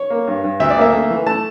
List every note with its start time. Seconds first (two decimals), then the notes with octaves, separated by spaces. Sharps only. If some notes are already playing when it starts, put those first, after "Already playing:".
Already playing: C#5
0.10 A#3
0.27 G2
0.44 G2
0.60 D2 E5
0.70 D5
0.77 A#3 E5
0.93 A3
1.10 E3
1.26 A3 A5